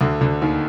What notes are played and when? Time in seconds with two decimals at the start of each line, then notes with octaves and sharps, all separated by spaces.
0.01 D2 D3
0.21 D2 D3
0.42 D#2 D#3